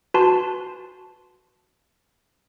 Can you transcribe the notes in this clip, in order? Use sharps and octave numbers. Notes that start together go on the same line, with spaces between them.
F#4 B4 G#5 A5 C6